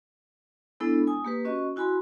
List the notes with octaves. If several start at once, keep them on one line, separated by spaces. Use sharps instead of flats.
G#3 B3 D4 E4 A4
G#5 D#6
A#3 G4 B4
C#4 F#4 D#5 C#6
E4 F#4 G#5 B5 C6